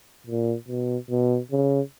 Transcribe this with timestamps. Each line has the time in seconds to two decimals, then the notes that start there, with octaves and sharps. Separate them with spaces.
0.26 A#2
0.68 B2
1.10 B2
1.51 C#3